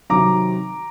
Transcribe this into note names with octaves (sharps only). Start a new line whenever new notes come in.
C3 D#3 F#3 A#5 D6